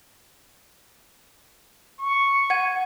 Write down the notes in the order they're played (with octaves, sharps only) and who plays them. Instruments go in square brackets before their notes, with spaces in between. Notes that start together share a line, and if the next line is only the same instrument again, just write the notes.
[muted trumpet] C#6
[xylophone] F#5 G#6 D#7